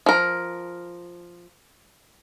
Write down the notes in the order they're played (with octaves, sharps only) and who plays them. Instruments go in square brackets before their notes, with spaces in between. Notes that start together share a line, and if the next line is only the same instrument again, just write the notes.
[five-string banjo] F3 A#4